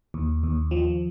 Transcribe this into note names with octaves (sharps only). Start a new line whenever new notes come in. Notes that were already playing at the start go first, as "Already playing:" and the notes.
D#2
D#2
F3